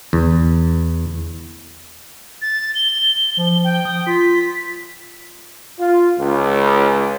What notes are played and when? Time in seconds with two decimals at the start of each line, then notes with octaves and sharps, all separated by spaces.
0.13 E2
2.42 A6
2.75 G7
3.37 F3
3.64 G5
3.85 D#6
4.07 F4 B6
5.79 F4
6.19 C#2